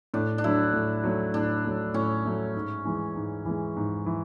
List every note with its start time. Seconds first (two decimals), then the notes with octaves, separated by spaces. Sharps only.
0.14 A2 D4
0.38 D4
0.44 F#3 A3 E4
0.73 A2
1.04 F#3 A3
1.34 A2 D4
1.65 F#3 A3
1.94 A2 C#4
2.25 F#3 A3
2.55 G#2
2.85 E3 G#3
3.15 G#2
3.45 E3 G#3
3.76 G#2
4.06 E3